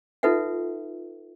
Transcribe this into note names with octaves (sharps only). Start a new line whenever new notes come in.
D#4 F4 A4 B4 E5 F#5